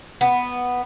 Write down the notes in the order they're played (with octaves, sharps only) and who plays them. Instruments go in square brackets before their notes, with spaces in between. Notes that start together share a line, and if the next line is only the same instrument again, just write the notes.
[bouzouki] B3